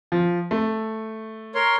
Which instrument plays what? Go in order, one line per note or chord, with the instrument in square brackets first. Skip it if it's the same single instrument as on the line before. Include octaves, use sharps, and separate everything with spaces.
[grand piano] F3
A3
[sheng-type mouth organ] A#4 C#5 C6